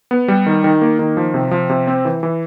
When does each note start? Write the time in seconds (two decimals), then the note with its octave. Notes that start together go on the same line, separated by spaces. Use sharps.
0.11 B3
0.28 G3
0.46 D#3
0.64 D#3
0.82 A#3
0.99 D#3
1.17 F3
1.34 C3
1.51 F3
1.70 C3
1.87 C4
2.05 E3
2.23 E3